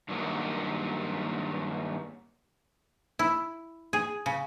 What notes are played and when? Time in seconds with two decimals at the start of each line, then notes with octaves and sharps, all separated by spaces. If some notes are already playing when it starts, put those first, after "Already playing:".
0.09 G2 D#3 F#3 A#3
3.19 E4
3.93 G#4
4.26 C#3